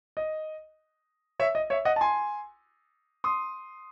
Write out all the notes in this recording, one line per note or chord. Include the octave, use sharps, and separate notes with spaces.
D#5
C#5 E5
D#5
C#5 E5
D#5 F#5
A5
G#5 C6
C6 D#6